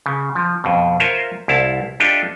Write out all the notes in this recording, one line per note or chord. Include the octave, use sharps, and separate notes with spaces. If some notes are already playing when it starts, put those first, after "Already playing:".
C#3
F3
F2 B2
F4 A#4 C5 C#5 E5
C2 E4 F5 A5
D4 F4 G4 A4 D#5 E5